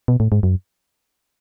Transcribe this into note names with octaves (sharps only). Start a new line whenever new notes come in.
B2
A2
G#2
F#2